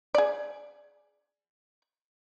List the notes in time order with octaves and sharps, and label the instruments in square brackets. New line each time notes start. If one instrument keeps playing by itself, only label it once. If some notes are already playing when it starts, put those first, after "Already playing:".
[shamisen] G#4 D5